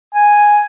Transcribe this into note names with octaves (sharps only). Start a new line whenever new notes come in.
G#5